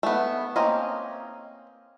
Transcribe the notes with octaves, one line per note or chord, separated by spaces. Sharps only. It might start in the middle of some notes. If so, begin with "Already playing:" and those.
A3 B3
A#3 C4 C#4 D#5